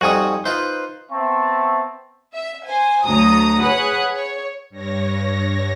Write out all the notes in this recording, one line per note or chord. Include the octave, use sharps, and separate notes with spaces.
F2 G3 D#4 F#4 G#5 D#6
D#4 F4 B4 C5
B3 C4 E5 A5 C#6
E5
C5 G#5
D2 F#3 A#5 D#6
G#4 B4 C#5 F#5 D#6 F#6
C#5
G2 C#5 A#6